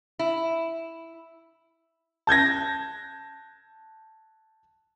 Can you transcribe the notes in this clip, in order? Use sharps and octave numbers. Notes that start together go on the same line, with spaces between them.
E4
A5 G6 G#6 A#6